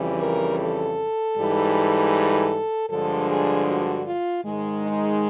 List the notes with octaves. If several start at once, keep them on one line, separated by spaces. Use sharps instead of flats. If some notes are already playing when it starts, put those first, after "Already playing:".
Already playing: F2 C#3 E3 G3
A#4
A4
G#2 E3 G3
G2 D3 F3 G#3 A4
G#4
F#4
F4
G#2 D#3 G#3
D#4